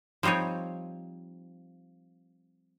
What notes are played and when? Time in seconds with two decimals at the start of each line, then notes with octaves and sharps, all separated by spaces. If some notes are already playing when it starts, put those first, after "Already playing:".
0.23 F3 G3 C4 D#4 C#5